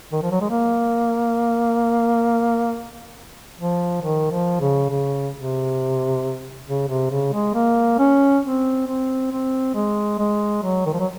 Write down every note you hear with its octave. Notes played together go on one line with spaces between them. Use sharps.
D#3
F3
F#3
G#3
A#3
F3
D#3
F3
C#3
C#3
C3
C#3
C3
C#3
G#3
A#3
C#4
C4
C4
C4
G#3
G#3
F#3
D#3
F3
F#3